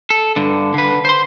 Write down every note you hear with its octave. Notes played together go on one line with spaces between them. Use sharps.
A4
G2 D3
D3 B4
C5 C6